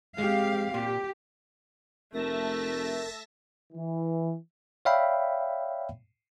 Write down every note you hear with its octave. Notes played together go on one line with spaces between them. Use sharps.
G#3 C4 G4 F5
A#2 G4
F1 A3 A#4 E5 A5 A#6
E3
C#5 D5 E5 F5 G5 B5